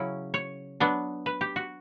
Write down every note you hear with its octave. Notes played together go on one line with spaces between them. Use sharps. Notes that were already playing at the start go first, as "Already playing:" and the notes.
Already playing: C#3 F#3 C#4 E4
C#5
F#3 B3 D4
B4
G4
F#4